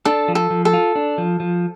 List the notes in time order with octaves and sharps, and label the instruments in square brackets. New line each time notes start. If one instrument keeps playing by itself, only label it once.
[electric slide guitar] D4 [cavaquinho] A4
[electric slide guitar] F3
[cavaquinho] A4
[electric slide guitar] F3
[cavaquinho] A4
[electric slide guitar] F4
D4
F3
F3